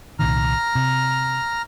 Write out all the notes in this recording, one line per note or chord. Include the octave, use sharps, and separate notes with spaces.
C2 A#2 D#3 A#5 F6
C3